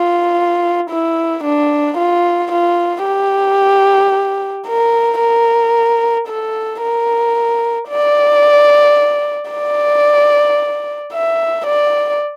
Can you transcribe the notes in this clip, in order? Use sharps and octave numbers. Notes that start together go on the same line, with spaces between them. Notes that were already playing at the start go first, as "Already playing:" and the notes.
Already playing: F4
E4
D4
F4
F4
G4
A#4
A#4
A4
A#4
D5
D5
E5
D5